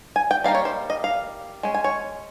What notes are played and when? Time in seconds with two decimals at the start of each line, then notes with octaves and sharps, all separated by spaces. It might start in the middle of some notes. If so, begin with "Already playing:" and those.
0.16 G#5
0.31 G5
0.44 G3 A#3 D#4 F5
0.55 C#5
0.65 C5
0.90 D#5
1.04 F5
1.63 G#3 C#4
1.75 G#5
1.84 C#5